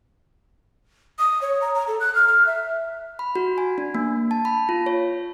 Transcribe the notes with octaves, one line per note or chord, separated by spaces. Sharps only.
D#6
C#5
A#5
A#5
A4
F#6
F6
F6
E5
B5
F#4
G#5
D4
A#3
A5
B5
F4
C#5